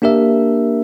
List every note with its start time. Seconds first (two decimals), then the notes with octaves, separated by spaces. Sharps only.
0.02 A#3 D4 G4 A#4 E5